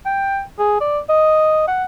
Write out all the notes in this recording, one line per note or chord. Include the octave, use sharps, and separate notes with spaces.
G5
G#4
D5
D#5
F#5